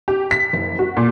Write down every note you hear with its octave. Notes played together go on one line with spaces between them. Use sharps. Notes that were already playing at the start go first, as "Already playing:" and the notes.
G4
B6
F#1
F#4
A#2